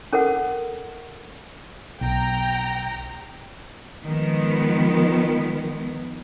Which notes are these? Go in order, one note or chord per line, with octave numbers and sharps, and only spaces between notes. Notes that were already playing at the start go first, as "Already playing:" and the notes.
C#4 A4 A#4 F#5
B1 G5 A#5
D#3 F3 G#3 B3